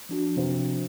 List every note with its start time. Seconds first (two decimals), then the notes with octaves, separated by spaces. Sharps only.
0.09 F3 D4 F#4
0.36 C3 C5